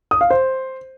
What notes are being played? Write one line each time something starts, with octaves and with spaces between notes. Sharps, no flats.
D#6
F5
C5